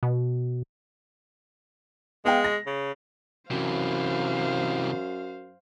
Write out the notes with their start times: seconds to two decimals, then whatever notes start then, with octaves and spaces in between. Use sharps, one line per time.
0.03 B2
2.25 G#3 B3 F5 G5
2.44 A#6
2.66 C#3
3.51 F#2 C3 E3 C5 F5